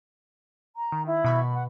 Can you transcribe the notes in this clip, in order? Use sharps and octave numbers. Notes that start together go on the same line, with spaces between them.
A#5
D#3
E4
B2 B5 C#6
F#5